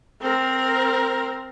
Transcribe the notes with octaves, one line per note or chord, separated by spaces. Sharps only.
C4 A#4